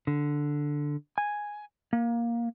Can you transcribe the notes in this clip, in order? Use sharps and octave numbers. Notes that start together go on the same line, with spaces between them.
D3
G#5
A#3